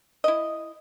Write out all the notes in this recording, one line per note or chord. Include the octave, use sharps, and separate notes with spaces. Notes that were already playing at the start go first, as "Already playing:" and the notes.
E4 D#5